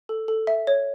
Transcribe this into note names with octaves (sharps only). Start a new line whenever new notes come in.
A4
A4
E5
C#5